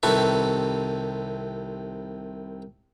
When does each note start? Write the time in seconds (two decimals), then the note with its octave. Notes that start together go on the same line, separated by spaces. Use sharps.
0.03 C2 C3 D#3 A4 B4 C#6